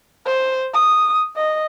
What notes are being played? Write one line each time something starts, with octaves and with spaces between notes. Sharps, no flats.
C5
D#6
D#5